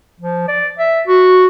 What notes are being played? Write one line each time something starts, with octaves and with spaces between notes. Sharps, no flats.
F3
D5
E5
F#4